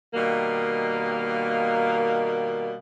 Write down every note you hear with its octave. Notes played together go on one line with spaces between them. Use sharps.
B2 D#3 G3 A#3